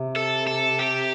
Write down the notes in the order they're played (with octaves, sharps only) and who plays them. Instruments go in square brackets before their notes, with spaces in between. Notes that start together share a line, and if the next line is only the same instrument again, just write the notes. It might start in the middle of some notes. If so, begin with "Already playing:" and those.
Already playing: [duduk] C3
[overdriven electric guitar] A4
A4
G4